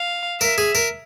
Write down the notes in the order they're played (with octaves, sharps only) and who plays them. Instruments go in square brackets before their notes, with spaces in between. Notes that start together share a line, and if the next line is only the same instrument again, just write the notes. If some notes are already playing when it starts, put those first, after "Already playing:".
Already playing: [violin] F5
[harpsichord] A#4 [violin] E5
[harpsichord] G#4
A#4